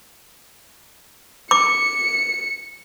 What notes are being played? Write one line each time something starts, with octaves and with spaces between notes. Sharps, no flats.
D6 C#7